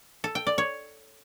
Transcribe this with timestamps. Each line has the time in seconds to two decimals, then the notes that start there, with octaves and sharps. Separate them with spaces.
0.24 A4
0.35 G5
0.47 D5
0.58 C#5